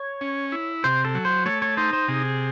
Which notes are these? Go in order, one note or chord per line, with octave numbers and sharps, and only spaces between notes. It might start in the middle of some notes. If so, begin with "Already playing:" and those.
Already playing: C#5
C#4
E4
C3 C5
A4
F#3
C5
A3 C#5
C#5
D#4 C5
C5
C3 G#4